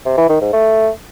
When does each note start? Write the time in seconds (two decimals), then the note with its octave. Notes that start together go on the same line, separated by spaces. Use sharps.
0.05 C3
0.17 E3
0.29 D#3
0.41 G#2
0.53 A3